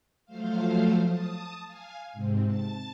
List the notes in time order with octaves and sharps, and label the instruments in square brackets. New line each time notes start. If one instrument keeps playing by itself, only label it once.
[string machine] F3 F#3 A3 C5 F5
A5 D#6
F5 G#5
G#2 C3 C4
A5 A6